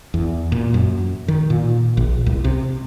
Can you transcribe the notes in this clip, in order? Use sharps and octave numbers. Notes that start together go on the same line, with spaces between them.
E2
A#2
F#2
D#3
A#2
A#1
C2
C3